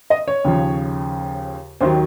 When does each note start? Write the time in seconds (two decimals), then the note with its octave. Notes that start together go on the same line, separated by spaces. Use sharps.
0.10 D#5
0.28 C#5
0.44 D#2 C#3 F3
1.81 D#2 D#3 F#3 C5